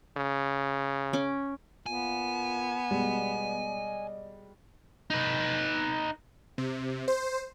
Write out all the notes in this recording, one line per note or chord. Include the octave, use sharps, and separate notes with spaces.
C#3
C#4 D6
A#2 B3 F4 G#5
B2 G3 G#3 D5 D#5
D#4 B4
C3
C5